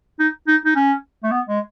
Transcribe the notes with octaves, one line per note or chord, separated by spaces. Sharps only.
D#4
D#4
D#4
C#4
A3
B3
G#3